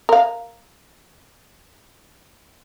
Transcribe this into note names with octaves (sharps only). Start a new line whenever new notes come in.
A#4 F5